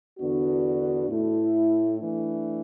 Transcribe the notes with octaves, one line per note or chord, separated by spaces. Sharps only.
E2 D3 B3 D4 F#4
A2 A3 E4 A4
E3 A3 D4